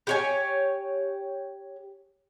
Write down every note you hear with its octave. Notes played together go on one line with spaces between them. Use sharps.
G4 C#5 G#5